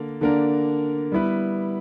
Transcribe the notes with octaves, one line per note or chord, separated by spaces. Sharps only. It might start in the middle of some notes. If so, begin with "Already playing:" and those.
Already playing: D3 A#3 D4 A#4
D3 A#3 D4 A#4
G3 B3 E4 B4